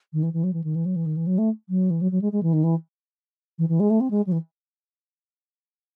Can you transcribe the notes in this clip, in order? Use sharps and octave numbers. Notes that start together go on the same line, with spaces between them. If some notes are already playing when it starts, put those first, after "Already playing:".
D#3
E3
E3
F#3
E3
D#3
E3
F#3
E3
D#3
E3
F#3
A3
F#3
E3
F#3
F#3
G#3
G#3
E3
D#3
E3
E3
E3
G#3
A3
C4
G#3
F#3
E3